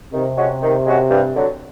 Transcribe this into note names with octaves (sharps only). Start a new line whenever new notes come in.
C3 D#3
G#3 C#4 F#4
D#3
G#3 C#4 F#4
G2
D3 F#3